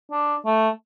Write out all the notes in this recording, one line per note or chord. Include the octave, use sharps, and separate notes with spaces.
D4
A3